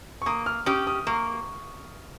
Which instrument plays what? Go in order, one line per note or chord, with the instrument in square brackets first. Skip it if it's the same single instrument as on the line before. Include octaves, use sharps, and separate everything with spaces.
[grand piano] C#6
[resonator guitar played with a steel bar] A#3 [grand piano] D#6
[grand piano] F6
[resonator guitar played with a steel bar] C#4 G4 [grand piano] D#6
[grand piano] D#6
[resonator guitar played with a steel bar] A#3 [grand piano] C#6